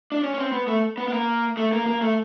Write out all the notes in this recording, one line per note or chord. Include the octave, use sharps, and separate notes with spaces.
D4
C#4
C#4
C4
B3
A3
B3
B3
A#3
A3
A#3
A#3
A3